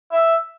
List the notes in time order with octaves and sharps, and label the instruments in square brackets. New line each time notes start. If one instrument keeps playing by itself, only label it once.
[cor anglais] E5